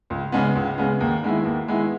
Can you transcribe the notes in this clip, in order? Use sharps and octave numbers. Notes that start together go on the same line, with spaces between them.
C#2
C#3 G#3 B3
C#2
C#3 G#3 B3
D#2
D#3 G#3 B3 E4
D#2
D#3 G#3 B3 E4